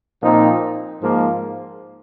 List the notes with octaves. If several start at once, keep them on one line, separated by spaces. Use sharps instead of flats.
A#2 F3 C4 D#4
G#2 F3 A#3